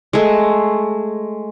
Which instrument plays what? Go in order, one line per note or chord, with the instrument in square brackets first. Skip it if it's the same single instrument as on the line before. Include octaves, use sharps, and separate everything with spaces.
[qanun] G#3 A3